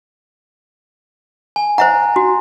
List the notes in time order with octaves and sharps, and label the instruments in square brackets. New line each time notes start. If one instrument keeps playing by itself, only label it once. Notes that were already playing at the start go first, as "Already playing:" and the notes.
[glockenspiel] G#5
[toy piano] C5 E5 F#5 [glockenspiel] A#5
[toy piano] F#4